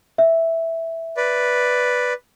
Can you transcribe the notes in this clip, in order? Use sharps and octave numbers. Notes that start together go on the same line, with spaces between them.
E5
B4 D5